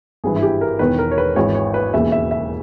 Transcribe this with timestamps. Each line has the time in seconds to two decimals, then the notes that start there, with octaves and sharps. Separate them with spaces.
0.24 G#1 G2 E3 G#4
0.36 E4
0.43 G4
0.61 A#4
0.79 E1 E2 D#3 B4
0.99 A#4
1.11 C#5
1.18 B4
1.36 G#1 G#2 E3 C#5
1.55 C#5
1.74 B4
1.94 E1 D#2 C#3 E3 E5
2.12 E5
2.31 E5